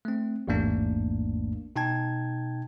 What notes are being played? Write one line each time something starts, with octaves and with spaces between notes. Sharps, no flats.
A3 C4
A1 E2 G#2 A3 A#3 D4
B2 D#4 G5 A5 G#6